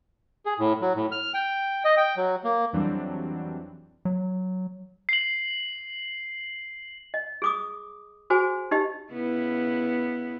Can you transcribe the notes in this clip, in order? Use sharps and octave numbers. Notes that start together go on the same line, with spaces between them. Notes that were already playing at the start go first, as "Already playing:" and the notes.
G#4
A2
F#3
A2
F6
G5
D#5
G5
F#3
A#3
F2 E3 F#3 G3 C4 D4
F#3
C7 F#7
D#5
G#4 D6 D#6
F#4 G#4 C5 G#5
D#4 G4 D#5
C#3 B3 E4